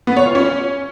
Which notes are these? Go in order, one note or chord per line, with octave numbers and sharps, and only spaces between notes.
B3
C#5
F4
C#4